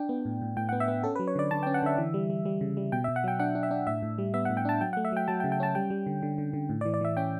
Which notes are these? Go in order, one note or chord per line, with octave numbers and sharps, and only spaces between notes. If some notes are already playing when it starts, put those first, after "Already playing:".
Already playing: D4 G5
B3
A2
A2
A2 G5
F#5
B3
E5
B3
C#4 A4
B4
F#3
C#5
D3 D5
D3 A5
G5
C#4
F#5
D3 E5
E3
G3
G3
G3
C#3
G3
B2 G5
E5
B2
F#5
F#3 G5
D4 F#5
D4
E5
D4
A2 E5
A2
G3
B3 E5
F#5
A2
G5
D4 A5
F#3 G5
F#5
A3
E5
F#3 G5
F#3 A5
G5
C#3
G5
C#4 A5
G3 G5
G3
D3
D3
D3
D3
A2
D5
E3
D5
E3 E5
C#4 G5